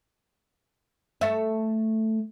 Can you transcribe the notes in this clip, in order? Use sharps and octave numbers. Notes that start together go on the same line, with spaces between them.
A3 E5